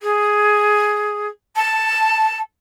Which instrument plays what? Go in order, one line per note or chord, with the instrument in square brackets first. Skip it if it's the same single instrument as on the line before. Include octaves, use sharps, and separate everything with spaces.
[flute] G#4
A5